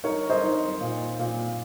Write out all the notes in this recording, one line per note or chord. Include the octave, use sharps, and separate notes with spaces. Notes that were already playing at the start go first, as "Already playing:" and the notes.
D#4 A#4 C#5
C5 D#5
D#4
A#2
A#2